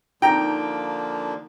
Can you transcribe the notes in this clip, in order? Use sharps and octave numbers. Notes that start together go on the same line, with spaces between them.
D3 F3 A#3 D#4 G5 A#5